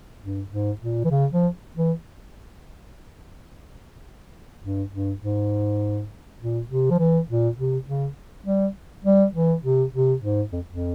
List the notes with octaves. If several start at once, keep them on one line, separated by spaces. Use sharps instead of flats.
G2
G#2
A#2
E3
C#3
F3
E3
G2
G2
G#2
A#2
C3
F3
E3
A#2
C3
C#3
G3
G3
E3
C3
C3
G#2
F2
F2